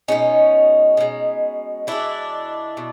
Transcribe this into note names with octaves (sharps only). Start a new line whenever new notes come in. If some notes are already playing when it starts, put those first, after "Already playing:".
B2 G#3 C#4 D#4
B2 G#3
B2 G#3 D4 E4
B2